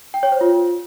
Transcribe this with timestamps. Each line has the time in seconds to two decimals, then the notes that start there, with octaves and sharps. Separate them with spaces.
0.14 G5
0.23 C#5
0.32 C5
0.41 F4